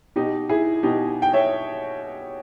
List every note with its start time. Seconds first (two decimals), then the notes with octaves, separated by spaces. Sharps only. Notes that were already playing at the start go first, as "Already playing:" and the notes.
0.16 B2 D#4 G4
0.49 E4 G#4
0.83 B2 D#4 G4
1.22 G5
1.33 C#5 E5